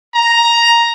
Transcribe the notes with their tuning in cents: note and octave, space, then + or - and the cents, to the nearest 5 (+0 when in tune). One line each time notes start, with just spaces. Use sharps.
A#5 +5